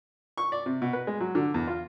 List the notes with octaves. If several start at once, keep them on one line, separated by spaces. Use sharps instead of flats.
C#6
D5
C3
B2
B4
G#3
F#3
D3
E2
F4